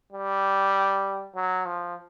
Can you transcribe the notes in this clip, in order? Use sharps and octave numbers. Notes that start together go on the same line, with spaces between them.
G3
F#3
F3